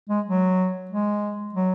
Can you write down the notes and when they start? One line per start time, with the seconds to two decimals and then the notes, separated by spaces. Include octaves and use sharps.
0.09 G#3
0.26 F#3
0.91 G#3
1.54 F#3